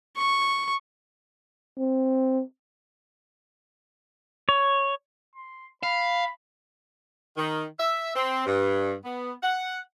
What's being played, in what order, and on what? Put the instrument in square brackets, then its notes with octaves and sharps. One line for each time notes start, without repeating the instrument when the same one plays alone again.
[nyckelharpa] C#6
[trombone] C4
[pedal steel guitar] C#5
[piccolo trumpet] C6
[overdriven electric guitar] F5 [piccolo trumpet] B5
[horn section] D#3
E5
C4
G2
B3
F#5